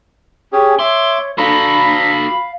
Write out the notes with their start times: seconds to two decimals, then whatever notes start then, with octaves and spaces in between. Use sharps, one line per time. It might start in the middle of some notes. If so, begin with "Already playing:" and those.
0.53 C#4 G4 G#4
0.79 C#5 E5 C6 D6
1.38 D4 F#4 A4 F5 A#5 B5